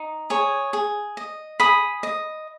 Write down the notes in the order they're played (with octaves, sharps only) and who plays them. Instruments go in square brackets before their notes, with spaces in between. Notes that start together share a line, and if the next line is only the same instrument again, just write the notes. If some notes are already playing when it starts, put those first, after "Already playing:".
Already playing: [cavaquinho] D#4
G#4 C#5
G#4
D#5
G#4 B5 D#6
D#5